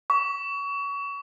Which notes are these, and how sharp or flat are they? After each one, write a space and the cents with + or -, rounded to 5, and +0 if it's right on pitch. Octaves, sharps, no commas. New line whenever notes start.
C#6 +30